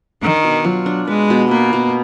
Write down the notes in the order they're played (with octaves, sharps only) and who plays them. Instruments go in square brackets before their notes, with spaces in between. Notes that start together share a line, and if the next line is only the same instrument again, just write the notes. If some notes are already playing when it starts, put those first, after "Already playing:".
[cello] D#3 [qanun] D4
[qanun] B2
[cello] F#3 [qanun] F4
[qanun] D4
[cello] G#3 [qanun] B4
[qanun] B2
[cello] A#3 [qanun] B4
[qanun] B2